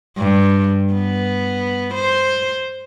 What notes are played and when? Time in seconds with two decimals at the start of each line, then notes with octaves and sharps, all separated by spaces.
0.18 G2
0.93 B3
1.95 C5